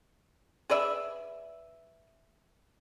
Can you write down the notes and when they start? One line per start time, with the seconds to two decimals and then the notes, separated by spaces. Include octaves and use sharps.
0.70 G#4 B4 D5 E5